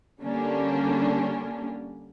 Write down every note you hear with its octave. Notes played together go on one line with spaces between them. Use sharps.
D3 G3 A#3 C#4 D4